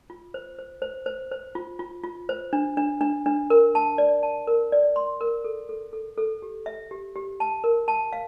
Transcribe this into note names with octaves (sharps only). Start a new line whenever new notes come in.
F4
C5
C5
C5
C5
C5
F4
F4
F4
C5
D4
D4
D4
D4
A#4
A5
D5
A5
A#4
D5
C6
A#4
A4
A4
A4
A4
G4
E5
G4
G4
A5
A#4
A5
F5